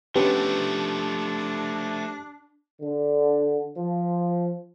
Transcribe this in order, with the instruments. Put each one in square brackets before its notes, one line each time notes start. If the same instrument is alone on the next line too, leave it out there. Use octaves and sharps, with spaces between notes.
[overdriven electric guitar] F3 A3 [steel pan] B3 C#4 B4 [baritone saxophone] D4 [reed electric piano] G4
[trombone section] D3
F3